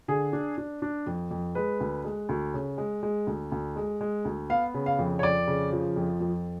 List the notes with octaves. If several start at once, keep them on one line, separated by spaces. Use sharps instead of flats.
D3 G#4
D4
D4
D4
F2
F2
G#3 B4
D2
G#3
D2
C#3
G#3
G#3
D2
D2
G#3
G#3
D2
B3 F5
C#3
F5
F2
C#5
F2 D5
C#3
F3
F2
F2